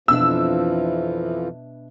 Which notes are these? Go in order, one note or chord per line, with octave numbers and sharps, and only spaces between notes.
F2 B2 E3 F3 D4 E5 E6